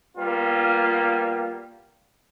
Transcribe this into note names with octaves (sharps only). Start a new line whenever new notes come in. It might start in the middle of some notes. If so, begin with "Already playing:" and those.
G3 A#3 B3 F4